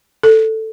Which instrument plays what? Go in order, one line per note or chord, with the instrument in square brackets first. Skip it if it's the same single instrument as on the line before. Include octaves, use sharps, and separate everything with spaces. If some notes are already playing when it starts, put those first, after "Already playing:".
[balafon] A4